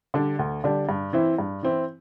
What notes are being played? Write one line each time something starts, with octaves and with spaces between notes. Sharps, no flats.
D3 G3 D4
D2
D3 G3 D4
G2
E3 C4 E4
G2
E3 C4 E4